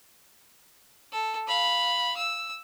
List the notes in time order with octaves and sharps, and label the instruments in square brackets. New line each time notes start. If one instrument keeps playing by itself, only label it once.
[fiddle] A4
F5 B5
E6